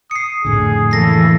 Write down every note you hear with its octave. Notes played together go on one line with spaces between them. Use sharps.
D#6 C7 C#7
F2 A2 D3 G#4
C#3 E3 A#3 A4 A#6 C7